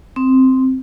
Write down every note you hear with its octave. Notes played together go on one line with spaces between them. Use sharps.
C4